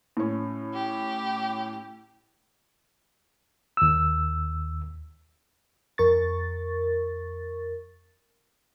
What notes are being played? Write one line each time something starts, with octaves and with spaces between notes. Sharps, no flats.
A2 C#4
G4
D#2 E6
F2 A#4 C#6 A6